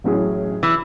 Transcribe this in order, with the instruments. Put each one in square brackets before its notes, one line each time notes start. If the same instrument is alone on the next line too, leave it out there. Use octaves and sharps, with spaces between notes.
[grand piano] A1 A2 F#3 C#4 G#4
[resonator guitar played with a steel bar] E3